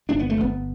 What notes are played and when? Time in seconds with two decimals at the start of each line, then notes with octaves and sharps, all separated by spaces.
0.09 G1 D4
0.19 B3
0.30 A3
0.37 G1 B3